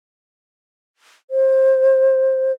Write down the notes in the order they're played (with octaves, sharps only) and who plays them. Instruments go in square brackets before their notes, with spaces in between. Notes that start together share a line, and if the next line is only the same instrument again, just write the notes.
[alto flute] C5